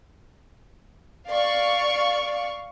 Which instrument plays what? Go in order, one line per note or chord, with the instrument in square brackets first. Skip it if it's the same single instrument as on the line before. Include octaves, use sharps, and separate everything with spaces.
[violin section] D5 F5 C#6